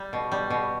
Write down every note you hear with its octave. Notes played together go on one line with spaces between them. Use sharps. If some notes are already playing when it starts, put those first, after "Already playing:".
Already playing: G3
B2
G3
B2